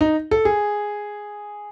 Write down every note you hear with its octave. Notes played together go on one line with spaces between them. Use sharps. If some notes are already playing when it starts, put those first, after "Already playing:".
D#4
A4
G#4